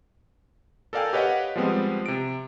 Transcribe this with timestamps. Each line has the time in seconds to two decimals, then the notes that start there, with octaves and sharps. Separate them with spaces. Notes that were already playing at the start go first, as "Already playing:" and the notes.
0.93 A4 A#4 D5 F5 G5 G#5
1.13 G4 B4 C#5 D#5 F5 F#5
1.56 F3 G3 G#3 B3 C4
2.06 C3 D7